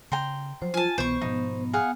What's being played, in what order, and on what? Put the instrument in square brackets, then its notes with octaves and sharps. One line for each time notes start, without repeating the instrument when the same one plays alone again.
[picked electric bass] C#3 [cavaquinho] G5 A#5 C6
[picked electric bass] F3 F#3 [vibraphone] C5
[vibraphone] F4 [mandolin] G#5 A5
[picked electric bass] C2 B2 E3 [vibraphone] B3 [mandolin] C5 C#6
[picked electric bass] G#2 B2 F3 [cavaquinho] D#4
[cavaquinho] G#4 F5 F#5